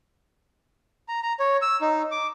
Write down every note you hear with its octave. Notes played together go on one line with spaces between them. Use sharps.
A#5
A#5
C#5
E6
D#4
D6